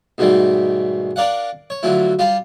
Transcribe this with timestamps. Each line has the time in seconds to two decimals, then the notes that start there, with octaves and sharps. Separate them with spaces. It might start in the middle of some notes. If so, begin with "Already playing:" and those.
0.18 G#2 B2 D#3 G3 A3
1.16 D4 A#4 D5 F5 F#5
1.70 C#5
1.83 D3 F3 F#3 A3 E4
2.19 G3 F4 G4 F5